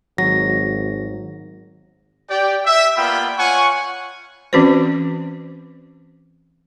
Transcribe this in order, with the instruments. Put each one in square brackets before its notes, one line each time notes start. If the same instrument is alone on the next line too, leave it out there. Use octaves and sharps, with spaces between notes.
[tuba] G#1 [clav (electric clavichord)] F#3 [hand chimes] A#6
[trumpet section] G4 D5 G5
E5
A#3 B3 F4 D5 G5 B5
F4 C#5 F#5 G#5 C#6
[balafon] E3 C4 C#4 F#4 B4 C5